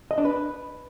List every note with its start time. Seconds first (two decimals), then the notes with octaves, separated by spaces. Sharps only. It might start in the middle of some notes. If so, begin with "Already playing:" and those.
0.11 D#5
0.18 D4
0.25 B4